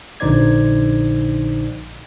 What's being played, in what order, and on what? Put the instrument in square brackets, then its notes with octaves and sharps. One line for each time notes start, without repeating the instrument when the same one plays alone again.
[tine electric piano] A#1 D3 D#4 C5 D5 G#6